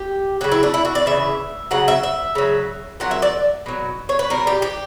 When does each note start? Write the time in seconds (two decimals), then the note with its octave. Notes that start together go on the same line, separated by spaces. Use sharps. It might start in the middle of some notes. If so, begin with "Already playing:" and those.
Already playing: G4
0.41 C#3 F#3 F#4
0.52 E4
0.63 D4
0.74 E4
0.85 F#4
0.95 D5
1.06 C#3 E3 E5
1.71 C#3 F#3 F#5
1.88 E5
2.03 E5
2.35 C#3 F#3
3.00 A#2 F#3 F#5
3.11 E5
3.22 D5
3.66 B2 F#3
4.09 C#5
4.19 B4
4.30 B2 G3 A#4
4.47 G4
4.62 G4